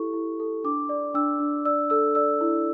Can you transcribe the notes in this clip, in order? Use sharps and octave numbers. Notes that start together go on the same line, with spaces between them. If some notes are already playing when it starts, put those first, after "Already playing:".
Already playing: E4 G4 A4 C#6
E4
A4
D4 D6
D5
D4 E6
D4
D5 E6
A4 E6
D5 E6
E4